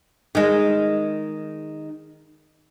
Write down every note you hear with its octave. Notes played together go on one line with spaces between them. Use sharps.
D#3 G#3